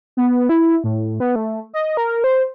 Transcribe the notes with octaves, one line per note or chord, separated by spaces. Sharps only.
B3
E4
A2
B3
A3
D#5
A#4
C5